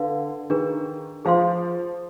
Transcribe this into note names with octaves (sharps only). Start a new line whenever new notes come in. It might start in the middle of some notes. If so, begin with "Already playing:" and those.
Already playing: D3 B4 F5
D#3 D4 G#4 B4
F3 G#4 C5 F5 C6